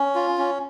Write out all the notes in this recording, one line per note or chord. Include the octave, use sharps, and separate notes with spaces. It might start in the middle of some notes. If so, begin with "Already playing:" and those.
Already playing: C#4
F4
C#4